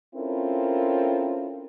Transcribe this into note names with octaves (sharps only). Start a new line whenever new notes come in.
C4 C#4 E4 F4 A4 A#4